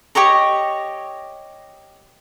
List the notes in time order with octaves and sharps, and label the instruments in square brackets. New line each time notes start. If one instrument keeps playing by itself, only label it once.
[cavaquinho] G4 C#5 D#5 A#5